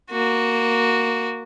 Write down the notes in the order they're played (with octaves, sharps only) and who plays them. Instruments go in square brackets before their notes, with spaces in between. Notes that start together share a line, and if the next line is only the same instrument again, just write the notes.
[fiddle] A#3 F#4